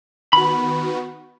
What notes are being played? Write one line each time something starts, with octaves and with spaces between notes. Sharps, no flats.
D#3 B3 F#4 B5